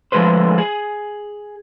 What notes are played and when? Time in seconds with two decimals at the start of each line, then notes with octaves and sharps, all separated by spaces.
0.12 D3 F3 G#3 A3 B4 C5
0.58 G#4